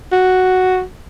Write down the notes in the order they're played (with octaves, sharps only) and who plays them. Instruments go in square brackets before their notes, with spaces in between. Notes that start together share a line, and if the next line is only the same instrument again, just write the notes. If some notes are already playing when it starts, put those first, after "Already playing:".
[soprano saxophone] F#4